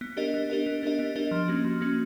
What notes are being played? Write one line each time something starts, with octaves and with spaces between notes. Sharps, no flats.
B3
D4 G4 A#4 D#5
B3
D4 G4 A#4 D#5
B3
D4 G4 A#4 D#5
B3
D4 G4 A#4 D#5
F3
A#3 C#4 F#4
F3
A#3 C#4 F#4